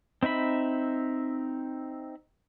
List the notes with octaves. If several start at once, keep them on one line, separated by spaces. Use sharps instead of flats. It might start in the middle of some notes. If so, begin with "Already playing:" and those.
C4 D#4 E5 B5